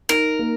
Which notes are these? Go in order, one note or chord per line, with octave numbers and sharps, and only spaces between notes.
D#4 A#4
A#3